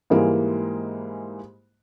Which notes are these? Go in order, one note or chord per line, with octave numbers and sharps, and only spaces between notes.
G#2 E3 G3 G#3 A#3